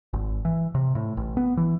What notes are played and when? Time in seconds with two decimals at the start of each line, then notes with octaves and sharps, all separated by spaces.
0.13 G#1
0.45 E3
0.75 C3
0.95 A2
1.17 A1
1.37 B3
1.57 E3